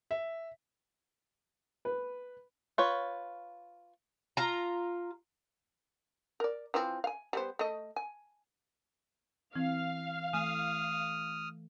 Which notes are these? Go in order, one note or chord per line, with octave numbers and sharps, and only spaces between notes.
E5
B4
F4 B4 C#5
F4 A#5
A#4 D5
E3 F3 C4
F5 G#5
G3 B3 C5
A3 D#5
G#5
E3 C4 F5
E3 A3 G#5 D#6 F6